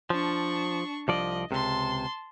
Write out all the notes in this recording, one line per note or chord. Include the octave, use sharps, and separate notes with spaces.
F3 D4 C#6
C2 F3 D5 D#5
C#2 C3 A5 C6